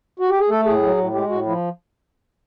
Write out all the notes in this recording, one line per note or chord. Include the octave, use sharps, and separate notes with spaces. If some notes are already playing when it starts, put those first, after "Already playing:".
F#4
G4
G#4
A3 A4
A2 G#4
F#3
A2
G#3 G4
A2 F#4
F3 E4